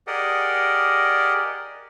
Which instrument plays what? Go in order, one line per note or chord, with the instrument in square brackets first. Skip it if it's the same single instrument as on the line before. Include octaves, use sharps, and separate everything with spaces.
[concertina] G4 G#4 A#4 D5 D#5 F#5